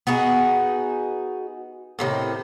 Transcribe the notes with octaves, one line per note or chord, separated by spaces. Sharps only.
B3 D#4 F#4 G#4
A2 C3 D#3